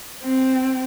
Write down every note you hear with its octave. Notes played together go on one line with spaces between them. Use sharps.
C4